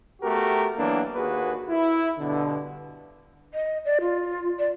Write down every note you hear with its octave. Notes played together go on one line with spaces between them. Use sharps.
A3 B3 F#4 G4 A#4
E3 F#3 A#3 B3 D4
D#2 A#3 F#4 G#4 B4
E4
G2 B2 D3
D#5
D5
F4
D5